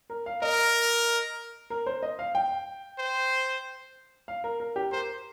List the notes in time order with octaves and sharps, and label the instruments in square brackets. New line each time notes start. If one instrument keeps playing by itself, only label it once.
[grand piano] A#4
F5
[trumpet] A#4 [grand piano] D#5
[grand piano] A#4
C5
D#5
F5
G5
[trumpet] C5
[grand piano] F5
A#4
A#4
G4
[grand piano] A#4 [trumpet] C5